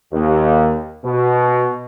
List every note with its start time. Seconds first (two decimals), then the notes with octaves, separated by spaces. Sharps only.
0.12 D#2
1.05 B2